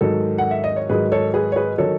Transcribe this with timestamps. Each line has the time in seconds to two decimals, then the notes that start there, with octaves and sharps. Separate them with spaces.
0.01 G#2 D#3 F#3 A4
0.38 F#5
0.51 E5
0.64 D#5
0.76 C#5
0.89 G#2 D#3 F#3 G#4 B4
1.12 A4 C#5
1.34 G#4 B4
1.52 C#5
1.56 G#4 B4
1.78 D#3 F#3 A4 C#5